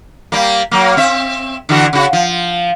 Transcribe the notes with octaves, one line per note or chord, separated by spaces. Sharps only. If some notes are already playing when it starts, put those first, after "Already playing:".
G3 A#3
F#3 A#3
C4 E5
D3 E3 F#4
C#3 F#4
F3